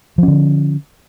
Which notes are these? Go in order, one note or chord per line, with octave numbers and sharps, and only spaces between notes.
D3 F3 C#4